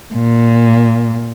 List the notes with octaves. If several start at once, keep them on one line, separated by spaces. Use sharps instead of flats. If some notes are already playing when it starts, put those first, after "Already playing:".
A#2